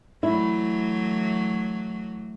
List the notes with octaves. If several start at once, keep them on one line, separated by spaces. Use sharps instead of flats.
E3 F#3 A3 E4